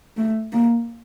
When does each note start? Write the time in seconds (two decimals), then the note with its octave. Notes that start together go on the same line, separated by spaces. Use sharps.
0.17 A3
0.52 A#3